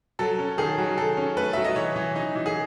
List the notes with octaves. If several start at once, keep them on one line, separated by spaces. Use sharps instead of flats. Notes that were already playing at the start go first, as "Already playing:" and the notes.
F#3 A4
C#4
D#3 G#4
F#3
D#3 A4
C#4
A3 B4
F#3 E5
D#5
E3 C#5
E3
D#4
E3
G#4